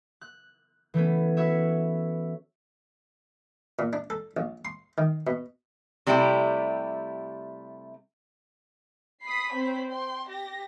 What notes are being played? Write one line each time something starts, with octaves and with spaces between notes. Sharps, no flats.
F#6
E3 A3 B3 C#4
F#4 B4 C#5 E5
A#2
D4
A4
A#1
C6
D#3
B2
C3 G3 A3 E4 G4
B5 D#6 B6 C7
C4 C5 C#5
G5 C6
G4 A#6